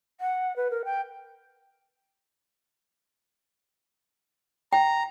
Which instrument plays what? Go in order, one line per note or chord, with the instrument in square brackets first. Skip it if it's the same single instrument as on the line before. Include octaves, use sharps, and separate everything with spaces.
[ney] F#5
B4
A#4
G5
[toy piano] G5 [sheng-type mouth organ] A#5